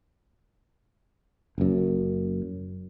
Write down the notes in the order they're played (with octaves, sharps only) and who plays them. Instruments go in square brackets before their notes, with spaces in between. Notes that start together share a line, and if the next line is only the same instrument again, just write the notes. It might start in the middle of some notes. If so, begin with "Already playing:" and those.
[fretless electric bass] F#1 F#2